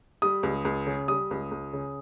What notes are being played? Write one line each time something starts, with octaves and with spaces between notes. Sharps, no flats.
G3 D#6
C#2
C#2
C#3
G3 D#6
C#2
C#2
C#3